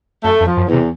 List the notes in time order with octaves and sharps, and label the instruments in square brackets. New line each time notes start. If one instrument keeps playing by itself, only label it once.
[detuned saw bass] F#2 [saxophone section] A3
[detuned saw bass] F2
[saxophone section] F3
[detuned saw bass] F#2
[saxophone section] E2
[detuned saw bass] C3